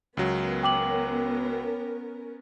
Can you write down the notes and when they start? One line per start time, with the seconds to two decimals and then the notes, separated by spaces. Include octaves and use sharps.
0.17 C#2 F#3 B3 C#4 A#4
0.63 G5 D6 F#7